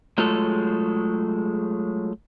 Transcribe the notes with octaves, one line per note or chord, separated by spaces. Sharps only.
F#3 G#3 A3 F4 G#4 A4